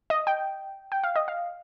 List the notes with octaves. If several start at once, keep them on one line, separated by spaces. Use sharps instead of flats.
D#5
G5
G5
F5
D#5
F5